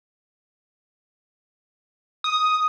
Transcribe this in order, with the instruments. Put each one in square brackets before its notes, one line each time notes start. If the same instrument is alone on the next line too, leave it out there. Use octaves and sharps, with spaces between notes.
[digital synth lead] D#6